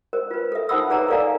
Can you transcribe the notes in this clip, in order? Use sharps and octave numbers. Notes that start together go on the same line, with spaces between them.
A#4 C5
F4 B4
A4 E5
D#4 C5 F#5 B5 D#6 E6
G#4 B4 C#5 F#5 A5 A#5
A4 A#4 D5 F5 G#5 A#5